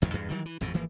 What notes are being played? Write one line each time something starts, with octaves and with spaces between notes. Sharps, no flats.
A1 F2 D#3
E2 G2
D#3 E3 F#3 G3
E3
A1 F2 G#2 B2
G#1 E3 F3 A#3